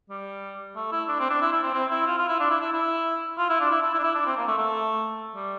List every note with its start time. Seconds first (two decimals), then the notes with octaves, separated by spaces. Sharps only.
0.10 G3
0.76 A3
0.92 E4
1.08 D4
1.20 C4
1.30 D4
1.41 E4
1.52 E4
1.63 C4
1.74 C4
1.90 E4
2.07 F4
2.18 F4
2.28 E4
2.40 D4
2.50 E4
2.61 E4
2.72 E4
3.38 F4
3.49 E4
3.60 D4
3.71 E4
3.82 E4
3.93 E4
3.99 D4
4.04 E4
4.15 D4
4.26 C4
4.37 A#3
4.47 A3
4.58 A3
5.35 G3